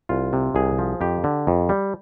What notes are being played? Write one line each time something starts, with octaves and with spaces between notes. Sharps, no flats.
C2 F4
C3
C2 G#4
F3
F2 G4
D3
F2
G3